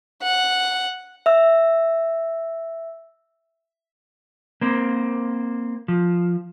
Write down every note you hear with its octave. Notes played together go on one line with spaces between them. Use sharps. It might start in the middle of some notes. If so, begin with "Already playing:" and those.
F#5
E5 E6
A#3 C4
F3